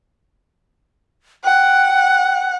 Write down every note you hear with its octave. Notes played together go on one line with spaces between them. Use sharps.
F#5 G5